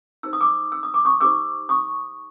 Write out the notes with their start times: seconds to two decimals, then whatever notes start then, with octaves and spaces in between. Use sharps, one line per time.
0.23 D#4 G4 C5 E6
0.33 D#6
0.40 D6 E6
0.72 E6
0.83 D#6
0.94 D6
1.05 C#6 D#6
1.21 D#4 G4 C5 D6 E6
1.69 C#6 D#6